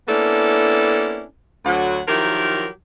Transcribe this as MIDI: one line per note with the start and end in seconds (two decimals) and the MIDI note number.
0.08 1.23 58
0.08 1.23 59
0.08 1.23 61
0.08 1.23 62
0.08 1.23 64
0.08 1.23 69
1.65 2.00 38
1.65 2.00 54
1.65 2.00 78
2.08 2.67 51
2.08 2.67 53
2.08 2.67 54
2.08 2.67 64
2.08 2.67 67
2.08 2.67 70